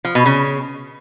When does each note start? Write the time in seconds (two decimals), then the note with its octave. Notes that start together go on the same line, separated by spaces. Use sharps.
0.05 F3
0.15 B2
0.26 C#3